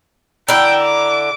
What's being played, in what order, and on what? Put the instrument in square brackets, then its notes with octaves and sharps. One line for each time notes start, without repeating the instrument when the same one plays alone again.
[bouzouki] D3 E4 [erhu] G5 [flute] A#5
[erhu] D6